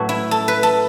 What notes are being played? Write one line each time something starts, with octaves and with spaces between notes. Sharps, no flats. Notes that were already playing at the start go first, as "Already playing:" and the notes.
Already playing: A2 F#3 A3 F#4 A4 B4
E4
A4
B4
A4